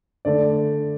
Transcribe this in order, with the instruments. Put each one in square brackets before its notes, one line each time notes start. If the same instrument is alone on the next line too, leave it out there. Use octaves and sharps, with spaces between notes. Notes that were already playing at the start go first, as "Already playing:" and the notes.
[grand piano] D3 A3 D5